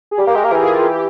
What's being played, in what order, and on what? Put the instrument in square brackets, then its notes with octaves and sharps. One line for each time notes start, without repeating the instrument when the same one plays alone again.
[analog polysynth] G#4
[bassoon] G3 [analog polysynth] G4
[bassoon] A#3 [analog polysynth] A#4
[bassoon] G#3
[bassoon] A#3 [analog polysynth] A#4
[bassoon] E3 [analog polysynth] G#4
[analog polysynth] F4
F4
G4